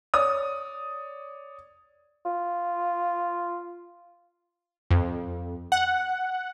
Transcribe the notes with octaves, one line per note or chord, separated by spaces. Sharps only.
C#5 D5 D#6
F4
F2
F#5